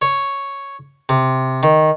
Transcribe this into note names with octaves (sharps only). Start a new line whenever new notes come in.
C#5
C3
D#3